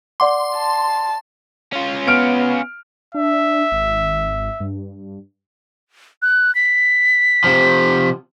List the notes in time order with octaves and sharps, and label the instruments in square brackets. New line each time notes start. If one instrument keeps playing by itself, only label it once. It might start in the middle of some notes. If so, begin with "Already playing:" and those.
[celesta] D5 F#5 D6 [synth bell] C6
[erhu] A5
[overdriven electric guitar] C#4 F4
[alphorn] B3 [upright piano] F6 D7
[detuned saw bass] D4 [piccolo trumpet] E5
[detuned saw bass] G#1
G2
[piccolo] F#6
B6
[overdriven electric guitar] C3 F3